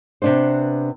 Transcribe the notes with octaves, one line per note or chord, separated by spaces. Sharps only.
C3 B3 D4 B4 C5